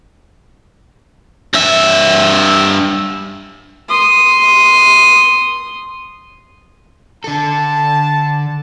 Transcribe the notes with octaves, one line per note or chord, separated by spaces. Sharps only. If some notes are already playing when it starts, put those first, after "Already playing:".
G2 E5
C6 D#6
D3 A4 A5